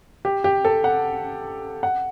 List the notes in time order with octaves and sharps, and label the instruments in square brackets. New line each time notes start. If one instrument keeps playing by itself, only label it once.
[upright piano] G4
G4
A4
F#5
F#5